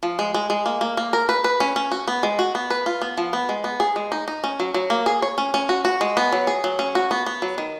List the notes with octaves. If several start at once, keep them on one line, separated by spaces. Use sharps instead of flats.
F3
G#3
G#3
G#3
A#3
A#3
A#3
A#4
B4
B4
C#4
C#4
F#4
B3
G#3
F#4
B3
B4
F4
B3
F3
B3
G#3
B3
G#4
G#3
D#4
D#4
C#4
F#3
F#3
A#3
G#4
C#5
C#4
C#4
F#4
F#4
G#3
B3
F#3
G#4
F#3
C#4
F#4
B3
B3
F#3
D#3